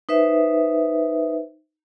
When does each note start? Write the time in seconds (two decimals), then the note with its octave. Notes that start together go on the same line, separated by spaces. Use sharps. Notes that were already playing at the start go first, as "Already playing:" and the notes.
0.09 D#4 B4 C5 E5